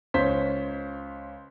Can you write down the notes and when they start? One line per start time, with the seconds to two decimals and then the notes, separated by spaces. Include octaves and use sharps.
0.14 C#2 C5 C#5 B6